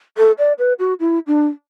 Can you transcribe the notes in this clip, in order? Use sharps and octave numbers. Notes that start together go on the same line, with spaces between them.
A4
D5
B4
F#4
E4
D4